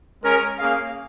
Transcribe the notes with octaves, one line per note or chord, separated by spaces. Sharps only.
G#3 C#4 A#4
A#3 C#4 G#4 F5